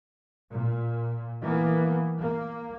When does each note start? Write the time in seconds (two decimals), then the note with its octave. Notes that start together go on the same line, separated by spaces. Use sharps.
0.51 A#2
1.41 E3 A#3 B3
2.19 A#3